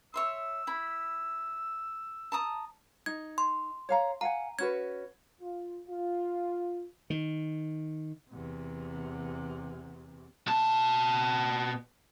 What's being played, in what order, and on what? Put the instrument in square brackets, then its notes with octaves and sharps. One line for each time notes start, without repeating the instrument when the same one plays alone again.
[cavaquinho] C#5 E5 C6 [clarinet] E6
[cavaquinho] E4 B5
A5 A#5 D#6
[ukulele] D#4 [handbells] G#6
[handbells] C6
[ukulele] C#5 F5 A#5
[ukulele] F5 F#5 G#5 [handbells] A#5
[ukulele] C#4 F#4 B4 [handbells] G#6
[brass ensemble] F4
F4
[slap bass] D#3
[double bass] E2 C3
[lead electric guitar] B2 A5